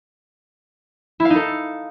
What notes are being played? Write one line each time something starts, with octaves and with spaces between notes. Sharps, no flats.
E4
F5
D#4
A4